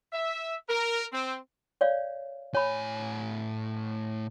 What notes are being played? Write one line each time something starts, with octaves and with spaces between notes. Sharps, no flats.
E5
A#4
C4
C#5 D5 F5
A2 C#5 G#5 B5